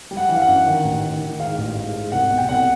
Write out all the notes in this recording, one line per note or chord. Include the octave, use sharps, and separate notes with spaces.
G3
F#5
E3
F5
F#5
F#2
D#3
A1
D#3
D#3
G#2 F5
A1
G#2
G#2
C2 F#5
B2
G5
C2 F#5